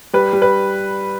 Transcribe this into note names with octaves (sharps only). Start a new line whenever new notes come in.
G3 B4
G3
B4